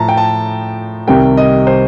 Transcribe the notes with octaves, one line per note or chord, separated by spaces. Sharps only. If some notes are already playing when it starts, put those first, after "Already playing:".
Already playing: A2 F3 A5 A#5
G5
A5
C2 C3 D#3 G3 G5
D#5
C5